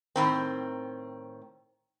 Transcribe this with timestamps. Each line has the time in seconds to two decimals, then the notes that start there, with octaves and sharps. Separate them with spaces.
0.16 A2 D#3 C4